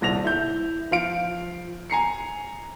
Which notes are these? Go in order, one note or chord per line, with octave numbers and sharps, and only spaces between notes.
D#1 C2 A#6 F7
E4 G6
F3 F5 D7
G#5 A#5 C7 C#7